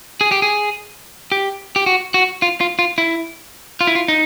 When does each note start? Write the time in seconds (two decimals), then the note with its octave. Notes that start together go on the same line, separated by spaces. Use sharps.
0.21 G#4
0.32 G4
0.42 G#4
1.32 G4
1.76 G4
1.86 F#4
2.14 F#4
2.42 F4
2.61 F4
2.79 F4
2.98 E4
3.81 F4
3.87 E4
3.95 F4
4.08 D#4